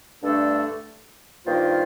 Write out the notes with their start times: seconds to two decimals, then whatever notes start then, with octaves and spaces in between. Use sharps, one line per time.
0.22 G2 D3 A3 D4 A4
1.44 G2 D#3 A#3 F4 C5